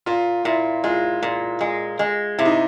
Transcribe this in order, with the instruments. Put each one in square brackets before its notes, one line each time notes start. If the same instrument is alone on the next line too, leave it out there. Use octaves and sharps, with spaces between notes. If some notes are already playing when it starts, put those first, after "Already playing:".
[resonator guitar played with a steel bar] A#2 [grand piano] F4
[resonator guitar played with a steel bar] A#2 [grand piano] E4
[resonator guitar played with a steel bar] G#3 [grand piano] F4
[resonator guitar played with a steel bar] A#2
G#3
G#3
[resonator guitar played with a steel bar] C3 [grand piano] E4
[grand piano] D#4